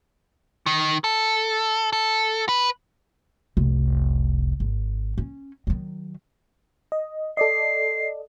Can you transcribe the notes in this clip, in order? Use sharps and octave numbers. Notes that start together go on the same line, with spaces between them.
D#3
A4
A4
B4
F1 C2
G#1
C#4
D#3 F#3
D#5
A4 D5 D#5 C7